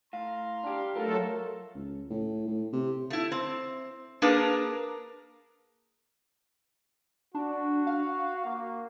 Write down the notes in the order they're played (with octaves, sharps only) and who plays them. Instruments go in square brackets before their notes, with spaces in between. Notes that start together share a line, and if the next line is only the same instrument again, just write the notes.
[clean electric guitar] A2 [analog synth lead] F5 [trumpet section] A#5 C6
[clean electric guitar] D4 G4
[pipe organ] F#3 A3 A4 [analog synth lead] A#3 [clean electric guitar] F4 A#4 F5
[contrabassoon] C#2
A2
A2
C3
[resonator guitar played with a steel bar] A3 E4
C4
A#3 D4 G#4 A#4 B4 A5
[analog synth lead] D4 [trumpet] F#4
[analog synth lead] F5
[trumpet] A#3